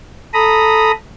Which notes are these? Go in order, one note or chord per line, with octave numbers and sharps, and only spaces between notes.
A4 A#5 B5 D#6